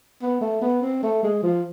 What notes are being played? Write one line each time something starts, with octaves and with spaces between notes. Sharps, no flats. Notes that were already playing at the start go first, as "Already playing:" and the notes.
B3
A3
B3
C4
A3
G#3
F3